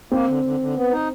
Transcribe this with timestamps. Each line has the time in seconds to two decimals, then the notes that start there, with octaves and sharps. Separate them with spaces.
0.11 A#3 C4
0.27 D3
0.44 D3
0.60 D3
0.76 B3
0.91 D#4